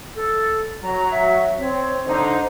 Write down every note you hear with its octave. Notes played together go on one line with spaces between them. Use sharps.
A4
F#3 A#5
E5
C4 C#5
D3 D#4 C5